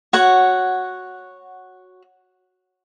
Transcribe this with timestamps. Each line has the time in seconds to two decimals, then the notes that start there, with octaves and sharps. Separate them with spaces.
0.13 F#4 C#5 F#5